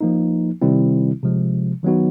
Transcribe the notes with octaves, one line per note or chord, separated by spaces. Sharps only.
F3 A#3 D#4
C3 D#3 G3 C4 E4
C3 F3 G#3
D#3 F#3 B3 D#4 F#4